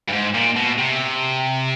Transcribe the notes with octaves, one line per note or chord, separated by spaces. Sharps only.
G2
G#2
A#2
B2
C3